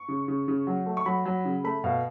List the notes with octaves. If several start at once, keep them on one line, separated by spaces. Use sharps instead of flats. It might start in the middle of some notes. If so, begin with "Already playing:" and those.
Already playing: C#6
C#3
C#3
C#3
F#3
A3
C#6
F#3 B5
F#3
C#3
A3 B5
B2 F5